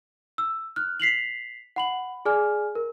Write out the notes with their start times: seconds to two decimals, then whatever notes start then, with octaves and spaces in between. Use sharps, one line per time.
0.38 E6
0.76 F6 F#6
1.00 B6 C7 F7 F#7
1.76 F#5 B5 F#7
2.25 G#4 D5 G#5 F6
2.75 A#4